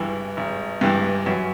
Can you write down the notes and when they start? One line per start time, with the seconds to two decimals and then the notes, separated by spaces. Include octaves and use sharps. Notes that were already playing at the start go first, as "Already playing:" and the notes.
Already playing: G#1 G2 E3
0.37 G#1
0.81 G2 E3
1.26 F#2